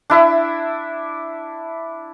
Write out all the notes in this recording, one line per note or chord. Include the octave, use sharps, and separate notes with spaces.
D4 E4 E5